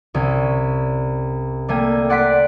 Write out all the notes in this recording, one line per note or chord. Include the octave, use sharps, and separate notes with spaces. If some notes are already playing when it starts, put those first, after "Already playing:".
C2 C#4
G3 A3 A#3 G5 G#5
D5 F#5 C6 F#6 B6 D7